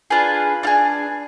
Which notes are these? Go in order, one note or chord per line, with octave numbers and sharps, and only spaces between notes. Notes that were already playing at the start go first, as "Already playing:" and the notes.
D4 F4 G#4 B4
D4 F4 G#4